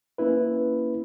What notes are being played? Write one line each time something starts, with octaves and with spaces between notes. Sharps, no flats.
A#3 C#4 E4 B4